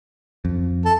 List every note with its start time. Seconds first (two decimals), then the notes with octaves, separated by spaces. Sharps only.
0.45 F2
0.85 A4